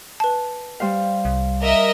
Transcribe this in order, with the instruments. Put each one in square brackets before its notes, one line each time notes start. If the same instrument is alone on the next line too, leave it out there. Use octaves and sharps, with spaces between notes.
[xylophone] B4 A5
[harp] G3 C5 F5
[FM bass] C2
[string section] A#4 D#5 E5